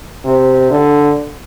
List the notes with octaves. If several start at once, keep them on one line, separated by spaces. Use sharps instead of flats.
C3
D3